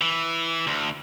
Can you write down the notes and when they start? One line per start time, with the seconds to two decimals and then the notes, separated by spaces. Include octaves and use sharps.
0.01 E3
0.67 D2